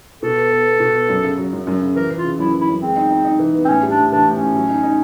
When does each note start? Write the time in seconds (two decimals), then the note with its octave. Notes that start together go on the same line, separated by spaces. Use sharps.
0.23 B2 A4
0.37 B3
0.51 B3
0.66 B3
0.80 B2
0.95 B3
1.09 F#2
1.24 C#3
1.38 F#3
1.53 F#2
1.67 F#2
1.82 C#3
1.96 E3 A#4
2.11 E3
2.17 F4
2.24 C#3
2.39 F#2 E4
2.54 E3
2.61 E4
2.68 F#2
2.82 G#3 C4
2.96 D#4
3.10 D#4
3.25 D#4
3.39 E3
3.55 B3
3.65 C4
3.68 A2 C#4
3.83 G3
3.90 D4
3.97 A2
4.12 E3 D4
4.27 A2
4.33 C#4
4.41 A2
4.55 F#3
4.69 D#4
4.83 D#4